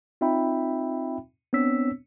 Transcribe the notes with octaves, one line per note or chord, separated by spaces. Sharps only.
C4 D#4 F4 E5 G5 B5
B3 C4 D4 C#5 E6 B6